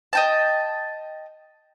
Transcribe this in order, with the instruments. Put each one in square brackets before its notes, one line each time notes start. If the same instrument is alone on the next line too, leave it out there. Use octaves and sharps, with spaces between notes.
[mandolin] D#5 G5 A5